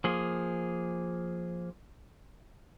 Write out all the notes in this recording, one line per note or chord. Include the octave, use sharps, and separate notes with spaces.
F3 A#3 G#4